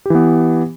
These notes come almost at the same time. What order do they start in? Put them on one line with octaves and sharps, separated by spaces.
G4 E3 B3